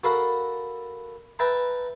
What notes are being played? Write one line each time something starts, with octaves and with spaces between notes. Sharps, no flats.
F#4 A4 A#4 F5 B5
B4 E5 G5 A5 A#5